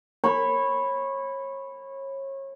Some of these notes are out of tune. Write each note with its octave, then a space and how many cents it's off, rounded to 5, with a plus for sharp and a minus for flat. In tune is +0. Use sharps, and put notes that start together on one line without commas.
C#5 -30 B5 +0